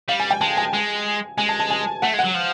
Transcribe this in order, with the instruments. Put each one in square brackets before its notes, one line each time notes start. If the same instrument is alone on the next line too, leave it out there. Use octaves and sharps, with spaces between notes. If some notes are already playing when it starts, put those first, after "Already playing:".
[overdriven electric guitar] G3 [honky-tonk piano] F5
[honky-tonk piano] G#5
G5
[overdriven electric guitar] G#3 [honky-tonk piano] A5
[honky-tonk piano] G#5
[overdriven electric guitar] G#3
[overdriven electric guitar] G#3 [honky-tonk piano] G#5
[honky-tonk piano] A5
A5
G#5
[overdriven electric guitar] A3 [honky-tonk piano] F#5
[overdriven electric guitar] G#3
[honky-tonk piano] F#5
[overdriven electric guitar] F#3
F3